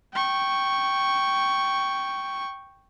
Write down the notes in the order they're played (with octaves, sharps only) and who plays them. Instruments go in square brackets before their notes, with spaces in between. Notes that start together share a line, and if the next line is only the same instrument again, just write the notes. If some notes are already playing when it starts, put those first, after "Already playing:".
[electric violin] G5 C#6